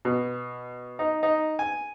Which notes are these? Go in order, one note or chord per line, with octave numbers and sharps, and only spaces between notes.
B2
D#4
D#4
G#5